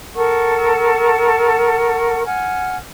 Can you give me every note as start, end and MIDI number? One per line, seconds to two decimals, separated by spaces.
0.14 2.23 69
0.14 2.23 70
0.14 2.23 78
0.14 2.23 85
2.25 2.76 78
2.25 2.76 80
2.25 2.76 89